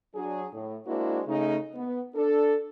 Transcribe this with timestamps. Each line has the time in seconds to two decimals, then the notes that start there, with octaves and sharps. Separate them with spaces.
0.15 F#3 D4 G#4
0.53 A2
0.87 G#3 A#3 D4 E4 F#4 C5
1.26 C#3 A3 D#4
1.75 B3
2.15 D4 A4